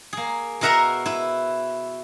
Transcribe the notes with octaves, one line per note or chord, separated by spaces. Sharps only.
A#3 G#4
B2 E4 A#4 E5 F#5 A#5
E4 B4